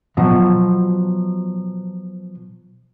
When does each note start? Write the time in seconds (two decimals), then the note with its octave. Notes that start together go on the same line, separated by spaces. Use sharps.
0.17 B2 F3 F#3